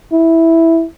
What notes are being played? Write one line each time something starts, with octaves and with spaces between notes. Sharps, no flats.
E4